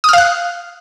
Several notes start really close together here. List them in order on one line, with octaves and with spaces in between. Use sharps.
D#6 F6 F5 F#6